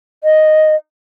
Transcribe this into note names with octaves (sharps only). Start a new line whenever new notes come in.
D#5